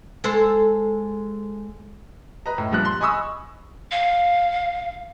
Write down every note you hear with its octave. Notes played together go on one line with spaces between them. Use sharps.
G#3 A4 C5
B4 D#5 A#5
A2
G2 A#2 F3 F#6
C6
D#5 G#5 B5 C#6 D#6 E6
F5